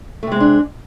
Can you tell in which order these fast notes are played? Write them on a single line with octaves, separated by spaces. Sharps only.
A3 C3 G#3 C4 D4